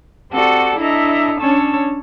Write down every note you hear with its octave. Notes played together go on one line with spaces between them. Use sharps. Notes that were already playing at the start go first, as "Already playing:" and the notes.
C4 F#4 G4 A4 D5
D4 E4 A4 D#5 E5 A#5
C#4 D4 C#5 A5 E6